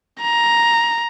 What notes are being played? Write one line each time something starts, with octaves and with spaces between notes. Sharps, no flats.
A#5